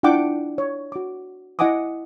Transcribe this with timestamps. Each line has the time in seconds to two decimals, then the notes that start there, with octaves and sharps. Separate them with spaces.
0.03 D4 E4 F4 F#5 G5 D6
0.58 C#5
0.92 F#4 D6
1.59 E4 D#5 F#5 G#5 D6 D#6